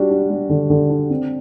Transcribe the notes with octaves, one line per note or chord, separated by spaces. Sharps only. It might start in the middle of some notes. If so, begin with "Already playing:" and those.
Already playing: G3 D4 F#4
D4
G3
D3
D3
D4
C4